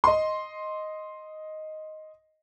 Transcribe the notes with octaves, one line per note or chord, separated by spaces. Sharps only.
D#5 C6